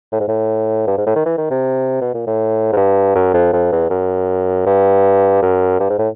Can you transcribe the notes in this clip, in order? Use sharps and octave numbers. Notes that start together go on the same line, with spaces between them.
A2
G#2
A2
G2
G#2
A2
D#3
E3
D#3
C3
B2
A#2
A2
G#2
G2
F#2
F2
F2
E2
F#2
G2
F#2
G2
G#2
A2